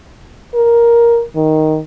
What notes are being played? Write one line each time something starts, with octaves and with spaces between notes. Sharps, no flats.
A#4
D#3